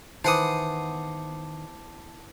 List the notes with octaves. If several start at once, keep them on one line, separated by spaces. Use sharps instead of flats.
D#3 E3 B3 C5 F#5 A5 D6 D#6